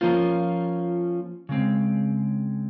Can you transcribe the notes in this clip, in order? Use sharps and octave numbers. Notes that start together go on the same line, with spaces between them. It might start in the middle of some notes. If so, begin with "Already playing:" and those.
F3 A#3 C#4 F4 C5
C#3 G#3 C4